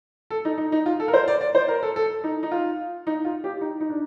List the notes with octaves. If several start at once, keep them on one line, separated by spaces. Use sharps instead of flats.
A4
D#4
D#4
D#4
F4
A4
A#4
C5
D5
D5
C5
A#4
A4
A4
D#4
D#4
F4
D#4
F4
G4
D#4
D#4
D4